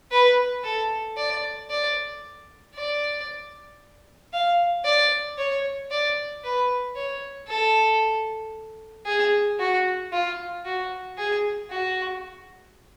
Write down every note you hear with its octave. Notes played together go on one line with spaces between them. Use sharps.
B4
A4
D5
D5
D5
F5
D5
C#5
D5
B4
C#5
A4
G#4
F#4
F4
F#4
G#4
F#4